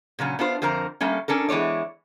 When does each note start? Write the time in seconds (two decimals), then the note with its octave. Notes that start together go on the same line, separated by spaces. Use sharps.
0.19 A#2 C#3 F#3 C#4
0.39 B3 D4 F4 C5
0.62 F2 D3 A#4 C5 A#5
1.01 G3 A3 A#3 C#4
1.28 C#4 D4 A4 A#4
1.49 E3 G#3 B3 C#5 D5